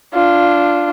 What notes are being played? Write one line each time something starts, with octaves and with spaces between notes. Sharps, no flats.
D4 F4